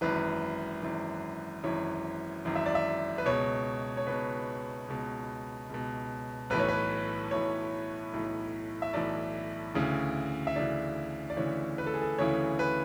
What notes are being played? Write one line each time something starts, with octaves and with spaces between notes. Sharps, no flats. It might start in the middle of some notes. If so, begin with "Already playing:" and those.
G#1 F#2 E3 B4
G#1 F#2 E3
G#1 F#2 E3 C#5
G#1 F#2 E3
E5
D5
E5
B4
C#2 B2 C#5
C#5
C#2 B2 B4
C#2 B2
C#2 B2
B1 A2 E3 B4
C#5
B4
B1 A2 E3 C#5
B1 A2 E3
E5
B1 A2 E3 D5
D2 C#3 E3
E5
D2 C#3 E3 D5
D5
D2 C#3 E3 C#5
B4
A4
G#4
A4
D2 C#3 E3 C#5
B4